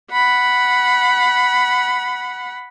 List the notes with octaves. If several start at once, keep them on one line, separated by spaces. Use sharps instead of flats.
F#5 B5